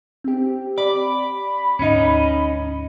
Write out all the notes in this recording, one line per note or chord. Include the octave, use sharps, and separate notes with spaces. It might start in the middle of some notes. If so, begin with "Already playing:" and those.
C4 G4
D5 B5 D6
D2 G#2 C#4 D#4 D#5